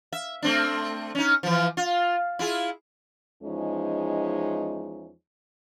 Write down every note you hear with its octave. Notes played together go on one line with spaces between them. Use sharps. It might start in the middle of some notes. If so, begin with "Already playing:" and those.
E5
A3 C4 D4
C#4 D#4
E3 F3
F4
E4 F4 G#4
E2 F3 G#3 C#4 D#4